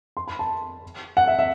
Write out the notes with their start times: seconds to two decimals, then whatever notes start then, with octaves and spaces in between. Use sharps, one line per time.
0.17 C6
0.28 B5
0.39 A5
1.17 F#5
1.27 E5
1.39 E5